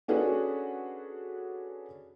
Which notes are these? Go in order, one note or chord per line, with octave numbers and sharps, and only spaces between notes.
C#4 D4 F#4 G#4 A4 B4